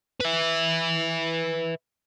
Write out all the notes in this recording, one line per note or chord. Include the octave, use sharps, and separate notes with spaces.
B4 E5